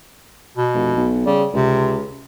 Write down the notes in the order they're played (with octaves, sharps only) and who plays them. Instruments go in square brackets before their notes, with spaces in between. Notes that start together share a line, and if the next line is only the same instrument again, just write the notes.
[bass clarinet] B2
[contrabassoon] F1
B1
[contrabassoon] C#3 [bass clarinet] G3
[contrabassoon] C#2 [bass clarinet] C3